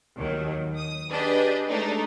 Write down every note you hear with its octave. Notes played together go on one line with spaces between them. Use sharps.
D#2 D#3 F#3
D#6
D4 G4 G#4 B4 D#5
G#3 A3 D4 D#4